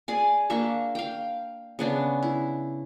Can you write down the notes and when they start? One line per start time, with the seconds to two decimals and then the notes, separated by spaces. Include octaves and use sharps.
0.08 G#4 D5 G#5
0.50 A#3 D4 E5 C#6
0.95 F5 G5
1.79 C#3 B3 D4
2.23 E4